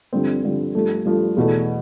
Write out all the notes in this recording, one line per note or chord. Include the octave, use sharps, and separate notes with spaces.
G2 D3 F3 C4
G2 D3 F3 C4
G2 F3 A3
G2 F3 A3
E2 B2 A3